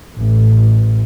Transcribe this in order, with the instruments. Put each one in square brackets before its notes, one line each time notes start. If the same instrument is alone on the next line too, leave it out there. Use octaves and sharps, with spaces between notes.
[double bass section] A1